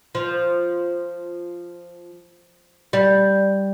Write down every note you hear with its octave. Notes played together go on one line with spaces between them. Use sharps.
F3
G3